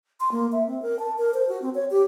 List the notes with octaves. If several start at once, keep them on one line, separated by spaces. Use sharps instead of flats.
C6
A#3
E5
C4
A#4
A5
A#4
C5
F#4
C4
C#5
G4